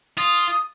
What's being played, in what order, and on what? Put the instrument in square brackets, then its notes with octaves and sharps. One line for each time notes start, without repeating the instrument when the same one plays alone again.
[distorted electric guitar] F4 [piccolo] D#6